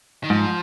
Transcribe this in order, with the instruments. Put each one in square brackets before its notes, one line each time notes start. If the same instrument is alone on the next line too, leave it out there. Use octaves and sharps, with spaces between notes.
[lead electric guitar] D#3
[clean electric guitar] G#2 [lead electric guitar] F3